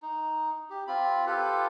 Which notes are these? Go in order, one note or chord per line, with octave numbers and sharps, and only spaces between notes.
D#4
G4
C4 F4 B5
F4 G4 A4 B4